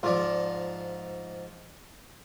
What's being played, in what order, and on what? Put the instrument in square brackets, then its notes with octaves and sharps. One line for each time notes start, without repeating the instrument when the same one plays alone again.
[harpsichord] G#2 F3 [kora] F4 D5